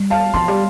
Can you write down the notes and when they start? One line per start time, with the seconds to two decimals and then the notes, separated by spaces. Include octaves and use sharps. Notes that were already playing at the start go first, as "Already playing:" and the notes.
Already playing: G3
0.10 F5 A5
0.34 F3 A5 C6
0.48 G3